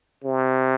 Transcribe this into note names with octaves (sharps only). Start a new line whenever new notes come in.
C3